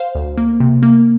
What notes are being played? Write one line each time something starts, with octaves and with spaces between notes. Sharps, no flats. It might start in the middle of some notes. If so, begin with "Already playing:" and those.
Already playing: C5 F5
D2
A#3
C3
A#3